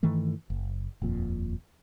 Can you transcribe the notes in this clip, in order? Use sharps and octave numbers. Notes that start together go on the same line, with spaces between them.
G2 D#3 E3 A3
F#1
D#1 F2 A#2